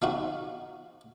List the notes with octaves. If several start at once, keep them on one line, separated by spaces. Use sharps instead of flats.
C4 D#4 F4 F#4